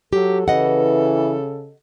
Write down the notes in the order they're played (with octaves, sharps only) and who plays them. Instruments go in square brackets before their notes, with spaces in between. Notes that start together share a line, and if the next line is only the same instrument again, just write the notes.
[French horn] F#3 [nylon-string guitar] G4 [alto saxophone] A4
[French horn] C#3 [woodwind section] E3 [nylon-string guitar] D#5 F#5